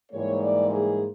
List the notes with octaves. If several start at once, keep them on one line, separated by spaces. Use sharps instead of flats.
G#2 E3 G3 A#3 C#5
D5
G#4